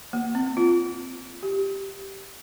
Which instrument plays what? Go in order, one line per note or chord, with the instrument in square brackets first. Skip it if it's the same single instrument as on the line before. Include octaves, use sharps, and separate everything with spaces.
[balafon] A#3
C4
F4
G4